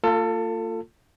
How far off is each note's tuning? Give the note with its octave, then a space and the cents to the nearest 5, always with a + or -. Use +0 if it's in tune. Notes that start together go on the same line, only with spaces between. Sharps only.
A#3 -40 F4 +0 A4 +25